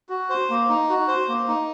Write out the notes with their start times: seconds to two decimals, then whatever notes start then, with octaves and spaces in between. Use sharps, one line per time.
0.09 F#4
0.30 C5
0.50 A#3
0.69 D#4
0.89 F#4
1.08 C5
1.28 A#3
1.48 D#4